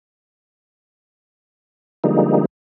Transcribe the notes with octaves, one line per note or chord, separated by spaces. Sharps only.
D3 F3 G3 G#3 A#3 D#4